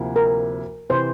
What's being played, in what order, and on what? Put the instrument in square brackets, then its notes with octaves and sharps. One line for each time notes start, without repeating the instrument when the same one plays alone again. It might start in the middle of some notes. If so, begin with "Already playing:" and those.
Already playing: [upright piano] D2 C3 F3 A#3 E4
[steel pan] A#4
[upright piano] C3 E3 [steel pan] C5